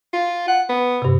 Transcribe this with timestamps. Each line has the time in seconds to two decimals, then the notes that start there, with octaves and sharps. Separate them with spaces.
0.13 F4
0.48 F#5
0.69 B3
1.02 G2 C3